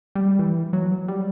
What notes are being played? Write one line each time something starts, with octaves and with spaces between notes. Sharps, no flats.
G3
E3
F#3
G3